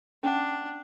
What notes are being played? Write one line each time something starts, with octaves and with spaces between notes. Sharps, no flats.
C#4 D4 F#5